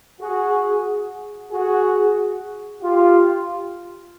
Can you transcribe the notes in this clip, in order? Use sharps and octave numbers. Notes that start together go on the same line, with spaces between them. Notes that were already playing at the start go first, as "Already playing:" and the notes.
F#4 G#4
F#4 G#4
F4 G4